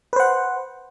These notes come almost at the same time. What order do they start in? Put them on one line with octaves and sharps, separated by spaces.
B4 C5 F#5